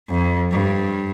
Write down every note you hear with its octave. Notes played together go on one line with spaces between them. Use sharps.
F2
G2